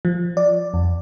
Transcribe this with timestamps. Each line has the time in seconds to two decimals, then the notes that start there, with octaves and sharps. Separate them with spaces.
0.05 F3
0.37 D5
0.74 F2